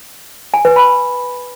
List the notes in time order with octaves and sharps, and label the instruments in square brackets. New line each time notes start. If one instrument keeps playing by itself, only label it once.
[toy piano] G#5
B4
B5